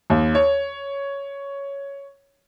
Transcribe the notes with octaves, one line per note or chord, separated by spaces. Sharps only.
D#2
C#5